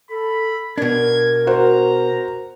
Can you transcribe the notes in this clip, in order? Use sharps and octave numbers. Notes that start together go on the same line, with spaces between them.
A4 B5
B2 D4 A#4 G#6
F#4 C5 A#5